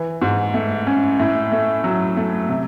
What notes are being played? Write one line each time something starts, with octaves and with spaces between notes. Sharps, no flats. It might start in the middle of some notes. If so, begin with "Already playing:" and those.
Already playing: E3
G#2
A3
C#4
A2
A3
F#3
A3
C3